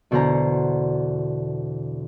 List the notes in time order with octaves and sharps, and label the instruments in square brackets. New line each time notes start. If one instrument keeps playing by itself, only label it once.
[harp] E2 B2 D3 C5 F#5 A#5